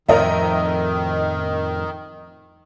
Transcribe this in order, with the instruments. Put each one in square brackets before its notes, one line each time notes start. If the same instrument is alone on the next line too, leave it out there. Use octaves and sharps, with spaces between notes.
[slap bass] F2 A2 F3 [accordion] D#3 [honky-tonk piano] A#4 D#5 E5